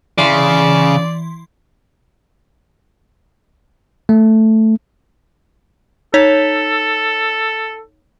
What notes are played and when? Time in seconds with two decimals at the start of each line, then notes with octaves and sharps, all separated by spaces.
0.18 C#3 E3 D5 C6
4.09 A3
6.14 D#4 A4 C#5 B6